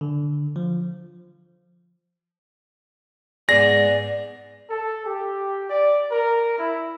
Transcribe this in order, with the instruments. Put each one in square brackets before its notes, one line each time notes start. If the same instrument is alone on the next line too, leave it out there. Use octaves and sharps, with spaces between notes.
[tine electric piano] D3
F3
[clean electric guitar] G#2 B3 G#4 [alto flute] D5 [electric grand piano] A#6
[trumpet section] A4
G4
D5
A#4
E4